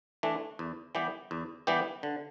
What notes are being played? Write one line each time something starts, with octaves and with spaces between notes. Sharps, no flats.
E3 A3 D4
E2
E3 G3 B3 G4
E2
E3 G3 B3 G4
D3